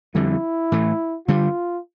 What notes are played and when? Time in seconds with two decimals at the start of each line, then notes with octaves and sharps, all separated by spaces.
0.15 F2 D3 G3 E4
0.72 A2 E3 A3
1.28 G2 D3 G3 F4